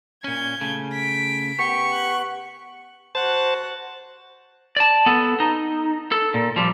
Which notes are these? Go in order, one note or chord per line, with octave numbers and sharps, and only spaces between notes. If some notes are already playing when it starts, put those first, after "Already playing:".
A#2 C#4 G6 G#6
C#3 A3
B6 D7
B3 G4 C#6
F#6
F#4 C5 F#5 A5 A6
D5 A5
B3 A4
D#4
A4
A#2
F3 G3